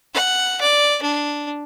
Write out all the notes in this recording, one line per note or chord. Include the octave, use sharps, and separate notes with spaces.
F#5
D5
D4